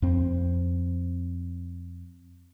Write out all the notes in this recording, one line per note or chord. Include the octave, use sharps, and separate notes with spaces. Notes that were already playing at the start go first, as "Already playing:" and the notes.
F2 C4